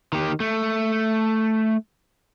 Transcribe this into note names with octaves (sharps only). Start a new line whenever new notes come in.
D#3 G4
A3